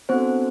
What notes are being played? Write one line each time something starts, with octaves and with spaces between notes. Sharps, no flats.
B3 C4 D4 F#4 A4 C5